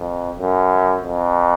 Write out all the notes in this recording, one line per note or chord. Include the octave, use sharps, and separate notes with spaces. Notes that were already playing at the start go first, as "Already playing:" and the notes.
Already playing: F2
F#2
F2